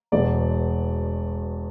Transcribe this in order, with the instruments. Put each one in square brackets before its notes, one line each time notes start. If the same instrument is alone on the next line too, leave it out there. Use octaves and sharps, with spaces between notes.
[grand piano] E1 E2 B2 D5